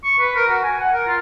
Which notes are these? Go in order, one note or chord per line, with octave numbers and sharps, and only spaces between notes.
C#6
B4
A#4
F#4
G#5
F#5
A#4
F4